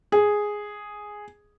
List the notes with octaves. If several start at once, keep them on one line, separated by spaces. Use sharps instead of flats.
G#4